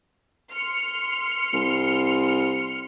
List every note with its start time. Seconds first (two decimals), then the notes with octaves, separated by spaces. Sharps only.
0.53 C6 F6 C#7
1.53 C2